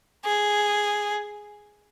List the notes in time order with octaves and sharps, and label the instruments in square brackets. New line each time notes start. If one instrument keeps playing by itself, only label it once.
[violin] G#4